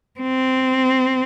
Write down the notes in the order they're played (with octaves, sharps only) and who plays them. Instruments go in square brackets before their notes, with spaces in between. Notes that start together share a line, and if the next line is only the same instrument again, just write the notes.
[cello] C4